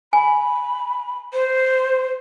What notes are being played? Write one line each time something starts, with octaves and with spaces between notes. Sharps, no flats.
G#5 B5
C5